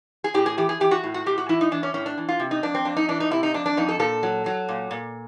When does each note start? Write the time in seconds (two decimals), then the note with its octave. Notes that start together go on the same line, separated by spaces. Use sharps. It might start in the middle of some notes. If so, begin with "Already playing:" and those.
0.24 G#4
0.34 A2 G4
0.46 G#4
0.58 E3 G4
0.69 G#4
0.80 E3 G4
0.91 F#4
1.04 A2
1.14 F#4
1.26 A2 G4
1.38 F#4
1.49 E3 E4
1.61 D#4
1.71 E3 D4
1.83 C#4
1.94 A2 C#4
2.06 D4
2.18 E3
2.29 F4
2.40 C3
2.51 D#4
2.63 F2 D4
2.75 C4
2.85 F2 D4
2.97 D#4
3.08 E3 D4
3.20 D#4
3.31 C3 E4
3.43 D#4
3.54 F2 D4
3.66 D4
3.77 F2 D#4
3.89 A4
3.99 A#2 A4
4.23 F#3
4.46 F#3
4.69 A#2
4.91 A#2